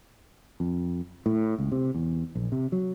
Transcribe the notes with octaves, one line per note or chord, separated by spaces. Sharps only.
F2
A2
C#2
C3
E2
A#1
C3
F#3